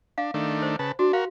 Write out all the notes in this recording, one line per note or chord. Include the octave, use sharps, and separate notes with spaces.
D4 F5
D#3 A3 D4
C5
C#3 B4 A5
D4 F#4
F#4 A#4 F5